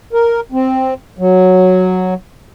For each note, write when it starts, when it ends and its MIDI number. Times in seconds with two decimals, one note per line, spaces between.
0.13 0.40 70
0.52 0.94 60
1.18 2.14 54